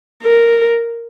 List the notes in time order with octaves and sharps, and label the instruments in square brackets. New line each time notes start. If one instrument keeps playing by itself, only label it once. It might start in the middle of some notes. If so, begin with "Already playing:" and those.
[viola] A#4